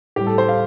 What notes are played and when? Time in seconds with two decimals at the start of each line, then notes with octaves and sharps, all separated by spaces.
0.16 A2 G3 G4
0.27 A4
0.38 C5
0.49 F5